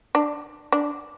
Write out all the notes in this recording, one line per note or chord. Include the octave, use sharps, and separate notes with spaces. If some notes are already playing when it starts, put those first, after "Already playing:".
D4
D4